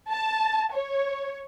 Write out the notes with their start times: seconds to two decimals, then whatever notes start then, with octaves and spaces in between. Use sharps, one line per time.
0.11 A5
0.74 C#5